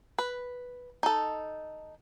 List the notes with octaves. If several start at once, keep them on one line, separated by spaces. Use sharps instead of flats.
B4
D#4 A4